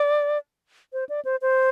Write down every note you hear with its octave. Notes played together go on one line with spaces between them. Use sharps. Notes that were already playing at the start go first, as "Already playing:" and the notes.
Already playing: D5
C5
D5
C5
C5